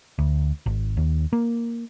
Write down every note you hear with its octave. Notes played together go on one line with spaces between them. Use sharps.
D2
G#1
D#2
A#3